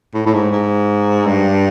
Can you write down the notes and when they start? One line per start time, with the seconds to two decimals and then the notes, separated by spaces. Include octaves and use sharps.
0.14 A2
0.26 A2
0.34 G#2
0.52 G#2
1.27 G2